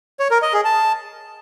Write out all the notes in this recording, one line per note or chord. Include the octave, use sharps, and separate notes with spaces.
C#5
A#4
D#5
G#4
A5